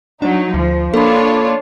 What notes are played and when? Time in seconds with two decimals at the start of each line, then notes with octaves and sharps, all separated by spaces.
0.22 F#3 D4 D#4
0.54 D2 F3
0.94 A#3 D4 F4 A4 C#5 B5